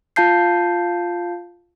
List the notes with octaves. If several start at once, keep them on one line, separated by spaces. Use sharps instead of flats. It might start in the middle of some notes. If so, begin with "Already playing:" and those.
F4 F5 A5 G6 C7